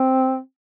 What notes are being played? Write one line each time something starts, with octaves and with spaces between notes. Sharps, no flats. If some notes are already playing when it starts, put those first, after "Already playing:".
Already playing: C4